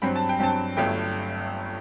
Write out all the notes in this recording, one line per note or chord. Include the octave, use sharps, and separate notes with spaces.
G2 F#3 C4 B5
A5
G5
G2 F#3 C4 A5
G1 G2 F#3 A3 G5